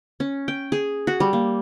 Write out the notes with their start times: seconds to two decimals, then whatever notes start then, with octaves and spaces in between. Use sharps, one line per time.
0.20 C#4
0.48 G5
0.72 G#4
1.07 F#4
1.20 G3
1.33 A#3